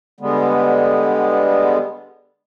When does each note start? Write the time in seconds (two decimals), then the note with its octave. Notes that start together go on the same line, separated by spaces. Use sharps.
0.20 D3 G3 G#3 B3